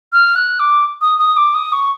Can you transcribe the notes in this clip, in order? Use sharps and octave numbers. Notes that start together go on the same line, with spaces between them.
F6
F#6
D6
D#6
D#6
D6
D#6
C#6